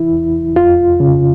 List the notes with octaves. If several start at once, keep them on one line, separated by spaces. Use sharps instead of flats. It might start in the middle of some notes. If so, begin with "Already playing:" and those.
Already playing: E3 E4
E2
F2 F4
C#3